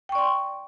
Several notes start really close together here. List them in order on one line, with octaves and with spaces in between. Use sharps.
G5 C#6 D5 C6